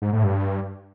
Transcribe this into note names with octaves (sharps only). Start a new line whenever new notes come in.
G#2
A2
G2